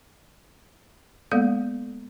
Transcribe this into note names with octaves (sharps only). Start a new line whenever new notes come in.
G#3 A#3 B3 A4 F5